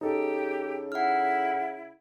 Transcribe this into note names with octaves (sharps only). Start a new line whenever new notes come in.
C#3 D#4 G4 A4
E4 F#5 F6